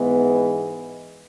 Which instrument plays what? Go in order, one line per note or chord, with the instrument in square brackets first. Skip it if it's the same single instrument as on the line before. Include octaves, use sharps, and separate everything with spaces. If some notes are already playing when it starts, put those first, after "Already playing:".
Already playing: [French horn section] G#2 E3 G#3 B3